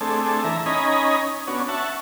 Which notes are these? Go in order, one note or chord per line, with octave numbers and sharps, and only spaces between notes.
A3 C4 D4 G#4 A4
E3 E5 A#5
C#4 D#4 D#5 G#5 A#5 B5
B3 C#4 D4 F#4
E5 F#5 A5 C#6